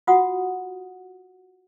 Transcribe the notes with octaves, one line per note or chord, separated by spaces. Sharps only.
F4 F#4 F#5 D#6